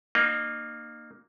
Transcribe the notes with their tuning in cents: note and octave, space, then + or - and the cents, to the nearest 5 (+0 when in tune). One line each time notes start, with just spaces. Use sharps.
A#3 +0 D#4 -35